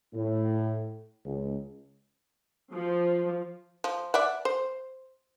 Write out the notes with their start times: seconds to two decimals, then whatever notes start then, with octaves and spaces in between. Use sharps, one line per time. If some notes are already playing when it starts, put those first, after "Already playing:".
0.14 A2
1.25 C#2
2.73 F3
3.84 F3
4.14 D5 E5 F#5
4.45 C5